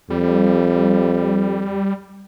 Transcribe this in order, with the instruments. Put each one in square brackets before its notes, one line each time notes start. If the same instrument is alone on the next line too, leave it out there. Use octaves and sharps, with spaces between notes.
[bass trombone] F2 [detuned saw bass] G3